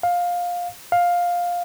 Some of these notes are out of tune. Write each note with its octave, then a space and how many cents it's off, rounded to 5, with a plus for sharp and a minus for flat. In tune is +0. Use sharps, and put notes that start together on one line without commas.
F5 +15
F5 +10